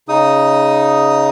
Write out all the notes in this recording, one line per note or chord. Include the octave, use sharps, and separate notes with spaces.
C#3 D#4 D#6